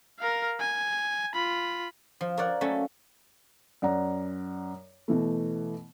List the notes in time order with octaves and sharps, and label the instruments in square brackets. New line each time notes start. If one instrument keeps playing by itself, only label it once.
[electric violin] A#4 F5
G#5
F4 B5
[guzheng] F3
A#4 C#5 D5 F#5
F#3 A3 A#3 C#4 A4
[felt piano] F#2 D5 F#5 A#5
B2 E3 A3